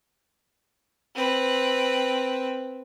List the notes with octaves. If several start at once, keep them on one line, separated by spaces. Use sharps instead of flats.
C4 B4